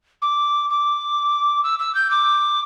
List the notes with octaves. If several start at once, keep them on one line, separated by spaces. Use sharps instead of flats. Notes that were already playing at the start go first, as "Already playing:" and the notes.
D6
D6
E6
E6
G6
D6